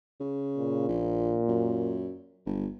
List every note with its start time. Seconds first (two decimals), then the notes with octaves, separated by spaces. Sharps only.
0.20 C#3
0.58 A#2
0.88 A#1
1.48 F#2
2.46 G1